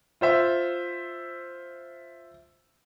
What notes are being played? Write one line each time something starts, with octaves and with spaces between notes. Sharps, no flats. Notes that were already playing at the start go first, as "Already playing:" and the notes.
F4 C5 E5